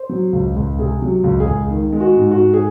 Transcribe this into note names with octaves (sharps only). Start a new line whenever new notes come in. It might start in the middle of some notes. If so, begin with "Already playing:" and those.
Already playing: C5
F#3
C#2
C#2
C3 G#4
F#3
C#2
G#4
C#2
D#3
G#3
F#4
G#2
F#4
G#2
G#4